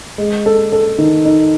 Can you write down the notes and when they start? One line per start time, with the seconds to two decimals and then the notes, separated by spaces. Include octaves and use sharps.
0.18 G#3
0.46 A4
0.72 A4
0.98 D#3
1.25 D#4